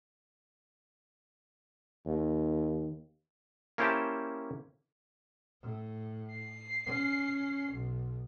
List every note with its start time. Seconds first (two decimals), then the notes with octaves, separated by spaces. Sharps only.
2.06 D#2
3.78 A#3 C#4 E4 G4 C5 A5
5.62 A2
6.35 C7
6.86 C#4
7.71 B1